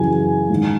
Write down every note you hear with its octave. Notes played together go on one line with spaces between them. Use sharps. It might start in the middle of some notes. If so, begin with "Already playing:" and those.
Already playing: F#2 C#3 E3 G#5
G#2 D#3